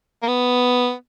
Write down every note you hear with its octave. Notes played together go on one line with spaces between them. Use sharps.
A#3
B3